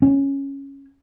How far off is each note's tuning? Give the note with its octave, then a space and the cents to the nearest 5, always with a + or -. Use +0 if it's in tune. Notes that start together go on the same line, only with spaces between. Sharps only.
C#4 -5